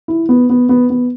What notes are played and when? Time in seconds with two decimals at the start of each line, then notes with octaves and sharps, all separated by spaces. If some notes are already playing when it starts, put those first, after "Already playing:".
0.08 E4
0.29 B3
0.50 B3
0.69 B3
0.90 B3